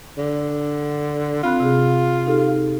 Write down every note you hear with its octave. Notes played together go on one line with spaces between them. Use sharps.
D3
C4 F4 B5 F#6
C3 G#4
D#4 G4 A4